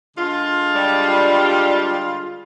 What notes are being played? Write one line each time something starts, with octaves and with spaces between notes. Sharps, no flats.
D3 G#3 F4
G3